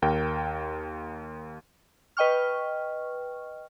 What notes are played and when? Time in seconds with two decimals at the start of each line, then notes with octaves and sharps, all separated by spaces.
0.02 D#2 A#4 G5
2.17 B4 D#5 G5 C#6 F6